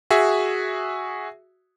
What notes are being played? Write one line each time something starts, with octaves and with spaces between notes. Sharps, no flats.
F#4 G#4 E5